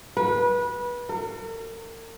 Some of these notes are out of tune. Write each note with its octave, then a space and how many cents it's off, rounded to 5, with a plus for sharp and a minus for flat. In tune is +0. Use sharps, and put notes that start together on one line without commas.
B4 -25
A#4 -45